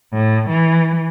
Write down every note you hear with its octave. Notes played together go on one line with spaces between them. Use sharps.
A2
E3